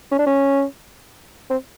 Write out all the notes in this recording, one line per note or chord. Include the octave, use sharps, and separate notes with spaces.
C#4
D4
C#4
C4